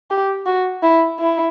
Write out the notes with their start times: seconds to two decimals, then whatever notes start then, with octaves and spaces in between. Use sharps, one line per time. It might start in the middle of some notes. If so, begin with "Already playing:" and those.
0.11 G4
0.46 F#4
0.83 E4
1.19 E4